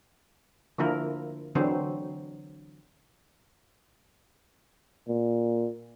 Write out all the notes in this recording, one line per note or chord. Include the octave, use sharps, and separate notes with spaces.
D3 F3 A#3 E4 A#4
D3 E3 F#3 C4 C5
A#2